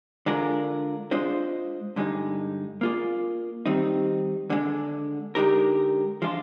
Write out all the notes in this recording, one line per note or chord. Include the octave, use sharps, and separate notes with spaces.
D3 G#3 D4 F4 A#4
G#3 D4 F4 C5 D#5
G2 D3 G#3 D#4
A#3 F4 G#4 D5
D#3 G3 C4 D#4
D3 G#3 D4
D3 G#3 D#4 G4 A#4
F3 G#3 D4 F4